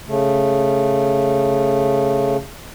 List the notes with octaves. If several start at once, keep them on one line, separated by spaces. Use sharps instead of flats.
C#3 A3